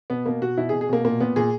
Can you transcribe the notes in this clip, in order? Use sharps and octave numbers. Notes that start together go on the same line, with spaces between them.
B2 B3
B2 A#3
B2 F#4
B2 E4
G#4
B2
G#4
B2 A#3
A#2 A#3
A#2 B3
A#2 G#4